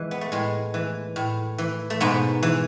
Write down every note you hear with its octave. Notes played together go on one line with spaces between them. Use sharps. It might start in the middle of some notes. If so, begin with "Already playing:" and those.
Already playing: E3 G#3
B3
A3
A2 G#3
E3
A2
E3
A3
G#2 B2 B3
E3